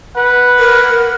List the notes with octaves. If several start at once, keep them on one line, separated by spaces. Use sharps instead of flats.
B4 F#5
A#4